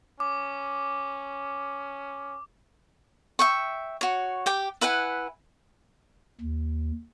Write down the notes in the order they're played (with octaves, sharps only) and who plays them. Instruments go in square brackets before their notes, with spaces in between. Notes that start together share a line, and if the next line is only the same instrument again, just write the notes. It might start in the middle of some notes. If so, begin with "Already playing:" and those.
[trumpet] C#4 [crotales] D6
[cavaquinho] E5 G5 C#6
F#4 C#5
G4 G5 D6
E4 B4 F#5 G#5
[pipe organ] D#2